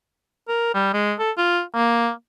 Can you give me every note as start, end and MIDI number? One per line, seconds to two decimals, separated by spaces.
0.49 0.71 70
0.74 0.93 55
0.94 1.14 56
1.19 1.31 69
1.38 1.61 65
1.75 2.10 58